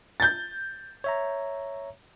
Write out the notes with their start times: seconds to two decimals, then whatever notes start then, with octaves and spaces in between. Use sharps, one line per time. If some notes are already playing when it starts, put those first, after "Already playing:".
0.20 G6 A6
1.04 C#5 E5 A#5